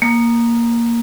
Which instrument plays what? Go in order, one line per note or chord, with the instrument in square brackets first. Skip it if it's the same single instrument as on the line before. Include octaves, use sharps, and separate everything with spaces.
[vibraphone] A#3